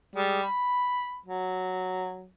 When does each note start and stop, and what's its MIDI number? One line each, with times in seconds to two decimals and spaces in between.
0.15 0.43 55
0.15 0.43 56
0.43 1.16 83
1.26 2.28 54